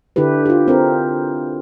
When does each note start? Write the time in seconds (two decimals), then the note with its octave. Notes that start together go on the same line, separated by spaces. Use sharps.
0.16 D3 D4 E4 G4 B4
0.46 F4 G4
0.68 C4 A#4